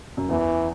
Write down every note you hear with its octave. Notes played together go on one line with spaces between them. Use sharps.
F#2
E2 E3